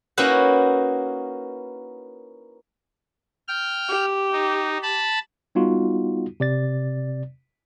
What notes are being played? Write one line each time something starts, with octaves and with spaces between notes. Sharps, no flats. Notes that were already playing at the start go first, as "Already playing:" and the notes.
A#3 C#4 D#4 E4 F#4 B4
G5 F6
G4
D#4
A5 B5
G3 B3 D#4 F4 F#4
C3 D5 A6